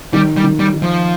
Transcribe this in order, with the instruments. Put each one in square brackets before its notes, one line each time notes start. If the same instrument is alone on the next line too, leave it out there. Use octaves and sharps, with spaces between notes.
[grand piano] D#3 [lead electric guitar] G3
[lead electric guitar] G3
[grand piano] D#3
[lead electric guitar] G3
[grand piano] D#3
[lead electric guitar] F3